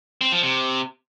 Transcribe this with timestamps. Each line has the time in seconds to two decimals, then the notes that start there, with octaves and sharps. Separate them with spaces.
0.21 C4
0.32 F3
0.43 C3